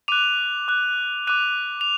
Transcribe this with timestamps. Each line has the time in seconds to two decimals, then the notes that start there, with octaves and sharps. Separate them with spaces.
0.08 D6 F#6 D#7 F7
0.68 D6 F#6
1.27 D6 F#6 D#7 F7
1.81 F7